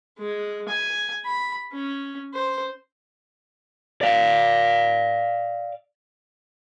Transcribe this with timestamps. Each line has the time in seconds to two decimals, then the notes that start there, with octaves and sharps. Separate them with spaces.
0.19 G#3
0.69 G#5
1.25 B5
1.73 C#4
2.34 C5
4.01 D5 F5